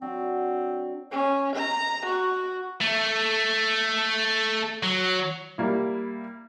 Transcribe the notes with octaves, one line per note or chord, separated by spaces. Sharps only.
F#3 C4 D4
C#4
A#5
F#4
A3
F#3
G3 A#3 E4